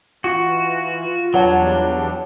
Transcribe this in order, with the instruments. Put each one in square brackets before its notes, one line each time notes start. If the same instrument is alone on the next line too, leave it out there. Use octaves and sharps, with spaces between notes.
[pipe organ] E3 [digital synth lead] F4 [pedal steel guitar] F#4
[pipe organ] E2 G3 D4 [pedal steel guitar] F#3 [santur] C#5 F#5 A5